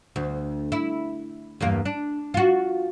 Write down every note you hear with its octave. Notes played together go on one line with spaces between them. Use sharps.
D2
E4
E2 G2 A#3
D4
F4 F#4